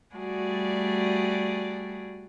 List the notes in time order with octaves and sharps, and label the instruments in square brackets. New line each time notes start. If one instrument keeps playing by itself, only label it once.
[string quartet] G3 A3 F#4 G#4 D5